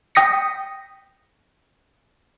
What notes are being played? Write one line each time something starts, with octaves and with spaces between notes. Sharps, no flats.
G5 D#6 A#6 B6 C#7